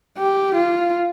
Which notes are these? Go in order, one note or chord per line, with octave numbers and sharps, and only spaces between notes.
G4
F4